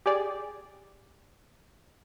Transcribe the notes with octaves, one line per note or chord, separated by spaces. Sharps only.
G4 G#4 D5